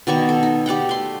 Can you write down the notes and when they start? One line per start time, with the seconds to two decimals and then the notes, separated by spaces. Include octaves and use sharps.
0.07 B2 D#3 D5 C#6
0.29 A4
0.43 D#4
0.66 G4 D5 F#5 G5
0.89 A3 C6